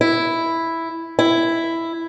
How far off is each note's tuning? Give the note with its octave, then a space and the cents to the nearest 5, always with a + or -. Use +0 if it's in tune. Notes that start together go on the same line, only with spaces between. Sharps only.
E4 +0
E4 +5